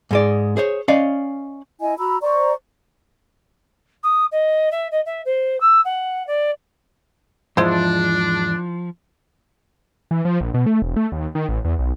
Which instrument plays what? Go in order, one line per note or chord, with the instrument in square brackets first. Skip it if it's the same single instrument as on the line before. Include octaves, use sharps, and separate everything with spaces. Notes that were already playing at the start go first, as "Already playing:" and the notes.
[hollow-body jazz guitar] G#2 G#3 D5
G#4 C5 C#5
C#4 D5 D#5 F5
[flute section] E4 D#5 G#5
F#4 A#5 B5 E6
C5 D5 A#5 C#6
[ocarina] D#6
D#5
E5
D#5
E5
C5
E6
F#5
D5
[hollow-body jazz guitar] E2 G#2 [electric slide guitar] F3 [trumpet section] D4 [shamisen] E4 F4 C5
[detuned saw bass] E3
F3
A#1
B2
A3
E1
A3
D#2
D#3
A1
E2
B1